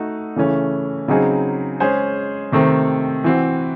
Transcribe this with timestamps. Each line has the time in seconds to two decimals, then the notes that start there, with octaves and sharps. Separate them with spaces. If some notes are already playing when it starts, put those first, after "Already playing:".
Already playing: A3 D#4 F#4
0.36 C#3 E3 A3 C#4
1.08 C#3 F#3 C4 D#4 G#4
1.80 G#3 C#4 G#4 C5
2.52 C3 D#3 A3 C4
3.24 E3 C4 F#4